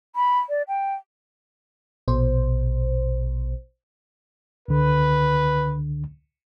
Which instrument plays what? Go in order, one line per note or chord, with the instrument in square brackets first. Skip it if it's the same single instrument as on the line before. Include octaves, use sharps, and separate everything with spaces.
[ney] B5
D5
G5
[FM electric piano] A#1 B2 C5
[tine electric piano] C#2 D3 [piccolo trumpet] B4